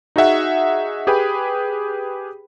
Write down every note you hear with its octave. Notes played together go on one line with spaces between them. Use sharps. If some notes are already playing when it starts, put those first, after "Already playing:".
D#4 F#4 G#4 E5 F#5
G4 G#4 B4 G5 B5